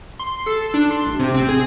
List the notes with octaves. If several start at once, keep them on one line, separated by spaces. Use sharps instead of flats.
C6
A4
D4
C6
A1
C3
C4
G#4